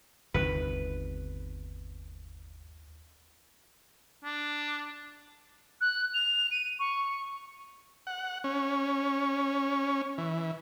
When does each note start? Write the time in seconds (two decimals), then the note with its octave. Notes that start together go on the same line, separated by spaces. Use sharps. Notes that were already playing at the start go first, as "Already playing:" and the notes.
0.34 G1 D#2 C3 D#3 B4
4.24 D4
5.81 F#6
6.14 F7
6.51 D#7
6.79 C#6
8.07 F#5
8.44 C#4
10.18 E3